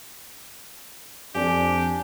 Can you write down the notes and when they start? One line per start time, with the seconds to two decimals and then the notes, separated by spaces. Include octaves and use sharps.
1.35 F2 D4 G4 G#5